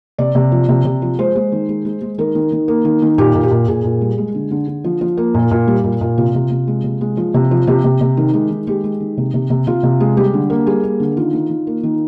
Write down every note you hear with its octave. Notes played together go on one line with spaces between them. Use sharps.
C3 D5
C3
F3
C3
C3
F3
G#3 C5
G#3
D#3
G#3
G#3
G#3
D#3 A#4
D#3
D#3
A#3
D#3
D#3
A#2 G4
A#2
G4
A#2
A#2 G#4
A#2
G3
G#3
D3
D3
D3
F3
F3
A#3
A#2
A#2
G3
A#2
A#2
C3 F4
C3
C3
G#3
C3
G#3
F3
C3
F3
C3 G4
C3
C3
D#3
G#3
D#3
G#3 G4
G#3
D#3
C3
C3
C3
C3 F4
C3
G#3
G3 G4
D3
A#3
G3 G#4
A#3
D3
D#3 F4
D#3
D#3
A#3
D#3